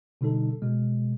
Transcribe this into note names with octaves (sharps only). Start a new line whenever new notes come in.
B2 D3 G3 D#4 A4
B2 G#3